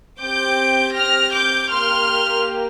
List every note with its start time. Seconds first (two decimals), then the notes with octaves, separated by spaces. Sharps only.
0.21 C4 G4 D6 G6
0.97 F6 A#6
1.34 D6 G6
1.72 A#3 G4 C6 F6